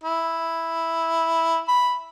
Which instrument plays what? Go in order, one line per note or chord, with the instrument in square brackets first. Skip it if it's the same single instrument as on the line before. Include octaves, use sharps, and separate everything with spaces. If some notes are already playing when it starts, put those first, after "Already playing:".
[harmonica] E4
B5